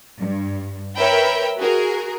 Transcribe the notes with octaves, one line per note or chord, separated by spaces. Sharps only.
G2
A#4 B4 C#5 E5 G5 B5
F#4 G#4 A#4